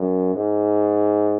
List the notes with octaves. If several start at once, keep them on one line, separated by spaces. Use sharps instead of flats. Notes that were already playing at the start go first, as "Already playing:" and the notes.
Already playing: F#2
G#2